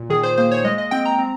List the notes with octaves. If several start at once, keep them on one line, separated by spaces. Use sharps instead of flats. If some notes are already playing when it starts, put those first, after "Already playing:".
Already playing: A#2
D#3 G#4
C5
A#3 C5
C#5
G#3 D#5
D#5
C4 G5
A#5
C4